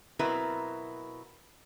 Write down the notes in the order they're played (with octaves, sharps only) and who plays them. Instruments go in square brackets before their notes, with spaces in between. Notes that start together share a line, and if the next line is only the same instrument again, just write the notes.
[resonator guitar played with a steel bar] B2 F#3 C4 E4 A#4 B4